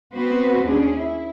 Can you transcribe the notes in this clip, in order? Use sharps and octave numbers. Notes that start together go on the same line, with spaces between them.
B3 C4 F#4 B4 C5
D#2 C#4 D4 G#4
E4